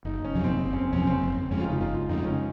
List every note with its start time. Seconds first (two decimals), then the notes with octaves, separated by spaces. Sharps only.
0.05 F#1 D#4
0.24 C#4
0.34 F2 C3 F#3
0.44 C4
0.64 F#1
0.73 C#4
0.78 C4
0.93 F2 C3 F#3 C#4
1.07 C4
1.22 F#1
1.51 F2 C#3 G#3 C#4
1.59 F4
1.66 D#4
1.80 F#1 F4
1.95 F4
2.09 F2 C#3 G#3 D#4
2.24 C#4